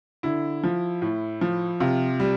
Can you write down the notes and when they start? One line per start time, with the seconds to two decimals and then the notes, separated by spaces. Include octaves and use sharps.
0.23 D3 E4
0.64 F3
1.02 A2
1.41 F3
1.80 C3 F4
2.20 G3